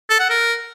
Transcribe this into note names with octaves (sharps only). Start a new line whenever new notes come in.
A4
F#5
A#4